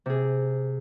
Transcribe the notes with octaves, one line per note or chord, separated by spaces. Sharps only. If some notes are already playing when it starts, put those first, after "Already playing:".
C3 G#4